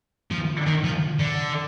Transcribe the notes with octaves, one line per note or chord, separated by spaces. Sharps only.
F3
D#3
F3
D3